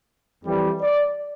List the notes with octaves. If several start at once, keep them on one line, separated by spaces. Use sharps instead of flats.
F2 E3 G3
D5